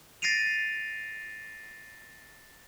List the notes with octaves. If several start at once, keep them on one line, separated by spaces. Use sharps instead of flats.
A6 A#6 C7 D7 D#7 F7